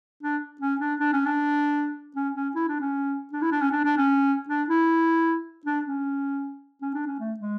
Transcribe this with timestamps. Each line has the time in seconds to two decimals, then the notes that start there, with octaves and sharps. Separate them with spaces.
0.23 D4
0.61 C#4
0.81 D4
1.00 D4
1.13 C#4
1.26 D4
2.16 C#4
2.35 C#4
2.55 E4
2.68 D4
2.81 C#4
3.33 D4
3.42 E4
3.52 D4
3.61 C#4
3.72 D4
3.85 D4
3.98 C#4
4.49 D4
4.69 E4
5.66 D4
5.85 C#4
6.82 C#4
6.95 D4
7.07 C#4
7.20 A3
7.40 G#3